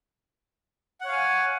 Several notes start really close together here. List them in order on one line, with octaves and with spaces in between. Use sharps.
F#5 C#5 F5 G#5